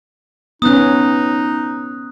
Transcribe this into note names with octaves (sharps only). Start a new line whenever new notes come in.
B3 C#4 D#4 D#6 F#6